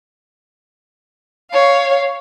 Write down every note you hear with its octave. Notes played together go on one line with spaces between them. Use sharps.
C#5 F5